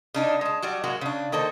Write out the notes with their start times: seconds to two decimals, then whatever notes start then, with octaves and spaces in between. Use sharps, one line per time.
0.14 C#3 D4 D#4
0.41 G#3 A5
0.62 F#3 G3 F#4 D5
0.84 F#3 G#3 A#3 F#4
1.01 C#3 D4
1.32 D#3 A#3 A4 C5